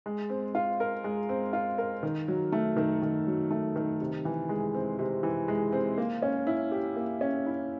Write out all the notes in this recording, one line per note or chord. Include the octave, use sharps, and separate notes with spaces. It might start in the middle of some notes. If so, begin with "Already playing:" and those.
G#3
C4
F4
A#4
G#3
C4
F4
A#4
D#3
F#3
A3
D#3
D#3
F#3
A3
D#3
C3
E3
G#3
C4
C3
E3
G#3
C4
A#3
C#4
E4
G4
A#3
C#4
E4